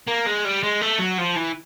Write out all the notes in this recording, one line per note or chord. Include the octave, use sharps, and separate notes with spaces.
A#3
G#3
G3
G#3
A3
F#3
F3
E3